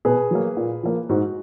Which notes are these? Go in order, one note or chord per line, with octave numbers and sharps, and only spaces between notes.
B2 G#4 B4
F#3 A#3
A#2
F3 A#3
G#2 F#4